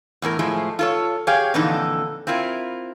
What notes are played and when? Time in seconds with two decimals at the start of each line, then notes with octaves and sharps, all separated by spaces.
0.22 E2 A2 D#4 A#4
0.39 A2 F3 G#3 A3
0.79 F4 A4 C#5
1.27 G4 G#4 C#5 F5 G5
1.54 F2 A#2 D3 E3 D#4 A4
2.27 C4 E4 F4 A#4